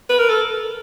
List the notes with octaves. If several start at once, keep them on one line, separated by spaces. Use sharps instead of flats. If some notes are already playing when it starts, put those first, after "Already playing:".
B4
A#4
A4